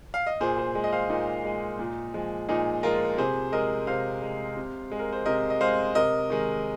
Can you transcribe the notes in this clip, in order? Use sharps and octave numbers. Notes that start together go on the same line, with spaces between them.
F5
D#5
A#2 G#4 C5
G#4 C5
G#3
D#5
C5 F5
A#2 A#3 D#4
G#3
A#2
F3 G#3
A#2 D#4 G#4
F3 G#3 F4 A#4
C3 G#4 C5
G#3 A#4 D#5
C3 C5 F5
G#3
C3
G#3
A#4
C5
C3 A#4 D#5
D#5
G#3 C5 F5
C3 A#4 D#5
D#3 G#3